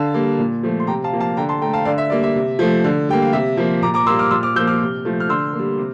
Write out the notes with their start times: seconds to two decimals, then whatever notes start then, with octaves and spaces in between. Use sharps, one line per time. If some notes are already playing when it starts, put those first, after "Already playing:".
Already playing: D3 F5 A5
0.14 G3 A#3
0.39 A#2
0.63 F3 A3
0.80 C6
0.87 C3 G5 A#5
1.04 F5 A5
1.13 F3 A#3
1.20 F5 A5
1.37 D3 G5 A#5
1.49 A5 C6
1.62 A3 G5 A#5
1.73 F5 A5
1.85 D3 D5 F5
1.98 E5
2.10 G3 A#3 D5
2.23 E5
2.36 C3
2.59 F3 A3
2.84 D3
3.09 G3 A#3 G5
3.22 F5
3.33 C3 E5
3.57 F3 A#3
3.82 A#2 A#5 D6
3.94 A#5 D6
4.06 G3 A#3 C6 E6
4.19 D6 F6
4.31 A#2 C6 E6
4.43 D6 F6
4.56 F3 E6 G6
4.60 A#3
4.67 D6 F6
4.80 C3
5.05 F3 A3
5.20 F6
5.29 D3 C6 E6
5.53 A#3
5.59 G3
5.78 C3